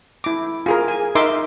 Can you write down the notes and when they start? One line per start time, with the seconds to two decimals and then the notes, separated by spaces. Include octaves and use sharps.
0.24 E4 D6
0.66 F4 G#4 A#4
0.88 G#5
1.15 D#4 A#4 E5 C6 D6